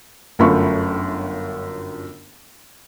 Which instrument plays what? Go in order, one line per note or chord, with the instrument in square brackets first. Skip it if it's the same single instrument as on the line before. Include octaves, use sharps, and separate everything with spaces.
[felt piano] G1 F#2 A3 F4 B5 C#6